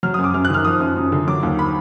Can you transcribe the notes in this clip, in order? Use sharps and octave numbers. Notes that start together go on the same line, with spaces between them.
F#3 F6
D#6
F#2
D6
F#2 F6
F#6
D#3 F6
F3 D#6
F#2
F#2
D3
F#3 D6
D#2
B5